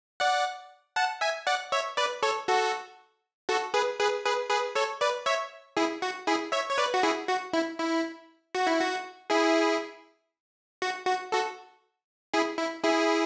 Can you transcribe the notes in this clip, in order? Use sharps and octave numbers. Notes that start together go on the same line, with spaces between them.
D5 F#5
F#5 A5
E5 G#5
D5 F#5
C#5 E5
B4 D5
A4 C#5
F#4 A4
F#4 A4
G#4 B4
G#4 B4
G#4 B4
G#4 B4
A4 C#5
B4 D5
C#5 E5
E4 G#4
F#4
E4 G#4
C#5 E5
C#5
B4 D5
F#4
E4 G#4
F#4
E4
E4
F#4
E4
F#4
E4 G#4
F#4
F#4
F#4 A4
E4 G#4
E4
E4 G#4